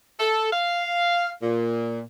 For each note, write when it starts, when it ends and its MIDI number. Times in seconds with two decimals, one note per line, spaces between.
0.19 0.48 69
0.52 1.30 77
1.43 2.00 46